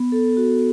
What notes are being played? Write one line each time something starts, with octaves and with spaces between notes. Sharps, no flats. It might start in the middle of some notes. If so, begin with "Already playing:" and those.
Already playing: B3
A4
F#4